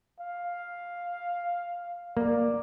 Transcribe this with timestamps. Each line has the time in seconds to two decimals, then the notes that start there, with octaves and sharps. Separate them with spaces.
0.20 F5
2.17 A#3 D5